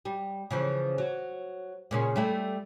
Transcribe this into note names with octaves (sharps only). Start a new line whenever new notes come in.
G3
C#3 E3 F3
F#3
A#2 C#3 C#4
G3 A3 E4